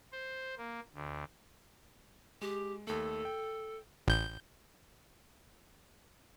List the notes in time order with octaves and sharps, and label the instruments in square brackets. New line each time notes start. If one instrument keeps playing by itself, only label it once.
[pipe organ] C5
A#3
D2
[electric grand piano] G#3 [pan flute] G4
[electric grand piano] D#2 A3 [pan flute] A4
[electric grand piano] G5
[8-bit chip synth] A1 G6